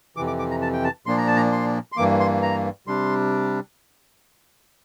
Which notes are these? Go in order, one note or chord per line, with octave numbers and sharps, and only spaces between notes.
F2 C3 E3 D6
D6
D6
A#5
A5
G5
A5
A#2 F3 A#3 D4 C6
A#5
A5
A#5
C6
C6
G2 E3 A#3 D6
C6
A#5
C3 G3 D4 C6